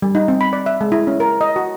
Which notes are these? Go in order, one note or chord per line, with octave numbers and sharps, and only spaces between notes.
G3
D#4
C4
B5
D5
E5
G#3
E4
C#4
A#4
D#5
F#4